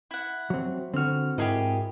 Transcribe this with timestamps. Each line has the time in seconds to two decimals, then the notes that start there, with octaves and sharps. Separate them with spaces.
0.11 E4 F#5
0.50 F#3 C4
0.94 D3 C4 F#4 F6
1.38 G#2 E4 G4 G#4 A#4 D#5